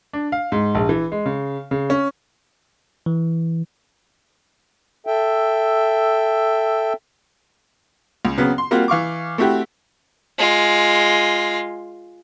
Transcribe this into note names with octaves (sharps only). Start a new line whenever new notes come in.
D4
F5
G#2
A#1
E3
G#3
C#3
C#3
C#4
E3
A4 E5 G5
C#2
C#3 F#3 B3 C4
C6
G3 A#3 C4 F4 F#4
E3 F5 C#6 D6
A3 C4 E4 F#4 G4
G#3 F4